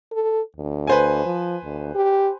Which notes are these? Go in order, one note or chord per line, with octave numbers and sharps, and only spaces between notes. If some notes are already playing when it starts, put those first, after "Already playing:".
A4
D2
B4 C5 G#5
F3
D2
G4